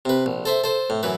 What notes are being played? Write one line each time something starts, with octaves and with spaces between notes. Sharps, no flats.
C3 B4
A#1
A4 C5 E5
A4 C5
A2
F#2 E3 B4